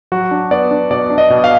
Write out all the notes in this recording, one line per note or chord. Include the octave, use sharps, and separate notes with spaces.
F#3 F#4
D4
B3 D5
D4
B2 D5
D4
D#5
B2
F5